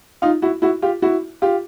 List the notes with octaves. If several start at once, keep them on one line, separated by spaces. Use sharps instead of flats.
D#4 F4
E4 F#4
E4 F#4
F4 G4
E4 F#4
F4 G4